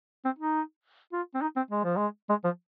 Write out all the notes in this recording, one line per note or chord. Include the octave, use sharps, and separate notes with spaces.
C4
D#4
F4
C4
D#4
C4
G#3
F3
G#3
G#3
F3